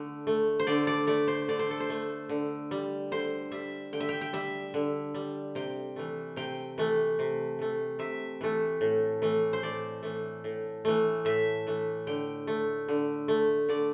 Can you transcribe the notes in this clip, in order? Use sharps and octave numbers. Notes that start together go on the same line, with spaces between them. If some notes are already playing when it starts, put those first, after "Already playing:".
Already playing: D3 A3
A3
C5
D3 D5
D5
A3 D5
C5
D3 D5
C5
A4
C5
A3
D3
G3
D3 C5
G3 E5
D3 G5
E5
G5
G5
G3 E5
D3
G3
C3 G5
E3 A3
C3 G5
E3 A3
C3
E3 A3
C3 E5
E3 A3
A2
E3 A3
C5
A2 D5
E3 A3
A2
E3 A3
A2 E5
E3 A3
D3 G5
A3
D3
A3
D3 D5